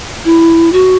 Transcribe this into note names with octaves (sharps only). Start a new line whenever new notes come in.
E4
F#4